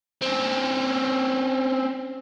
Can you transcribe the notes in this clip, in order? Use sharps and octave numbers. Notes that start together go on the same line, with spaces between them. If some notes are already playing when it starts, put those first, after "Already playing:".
C4 C#4